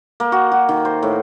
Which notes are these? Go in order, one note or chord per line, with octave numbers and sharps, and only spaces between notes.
A#3
F#4
F#4
D#3
C5
A2